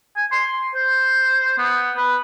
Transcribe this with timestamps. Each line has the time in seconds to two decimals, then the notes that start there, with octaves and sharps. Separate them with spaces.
0.16 G#5
0.32 C6
0.75 C5
1.58 B3
1.97 B4